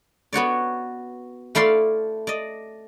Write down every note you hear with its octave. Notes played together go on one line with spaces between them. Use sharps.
B3 F#4 C#5 D5
A3 E4 D5 F5 C6
D5 D#5